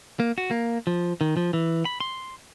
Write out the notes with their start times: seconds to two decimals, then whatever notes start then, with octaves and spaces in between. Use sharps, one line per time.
0.20 A#3
0.38 F#4
0.51 A#3
0.87 F3
1.21 D#3
1.37 F3
1.53 E3
1.85 B5
2.00 C6